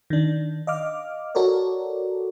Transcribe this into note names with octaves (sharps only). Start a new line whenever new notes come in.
D#3 D4
D#5 F5 D6 F6
F#4 A4 A#4 C#5 D5